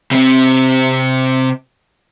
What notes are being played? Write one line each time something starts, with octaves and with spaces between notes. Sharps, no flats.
C3 C4